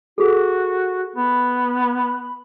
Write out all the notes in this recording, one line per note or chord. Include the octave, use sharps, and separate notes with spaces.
F#4 G#4 A4
B3 B5